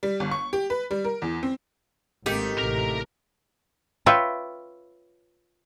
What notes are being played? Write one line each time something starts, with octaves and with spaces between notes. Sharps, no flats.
G3
G1
C#6
G4
B4
G3
A#4
E2
C4
G#1 A3 A#3 C4 D#4 G4
A1 C3 A#4 A#5
F4 B4 C#5 E5 G5